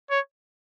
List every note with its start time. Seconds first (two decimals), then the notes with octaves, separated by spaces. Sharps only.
0.10 C#5